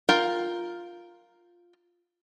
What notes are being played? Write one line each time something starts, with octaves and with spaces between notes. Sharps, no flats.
F4 A#4 G5